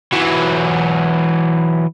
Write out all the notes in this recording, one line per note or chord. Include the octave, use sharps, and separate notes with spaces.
E3 F#3